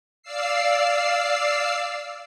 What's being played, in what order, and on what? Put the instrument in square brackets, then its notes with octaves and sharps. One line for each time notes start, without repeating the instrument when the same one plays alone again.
[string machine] D5 F5 E6 C7